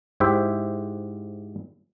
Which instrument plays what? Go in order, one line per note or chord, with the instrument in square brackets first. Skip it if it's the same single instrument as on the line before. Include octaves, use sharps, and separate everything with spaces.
[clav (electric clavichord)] G#2 E4 G4 C5 E5 G5